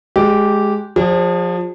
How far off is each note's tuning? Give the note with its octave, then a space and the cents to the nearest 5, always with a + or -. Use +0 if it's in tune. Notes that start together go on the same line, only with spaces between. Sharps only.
G#3 +10 G4 -10
F3 +25 G#4 -35 D5 +0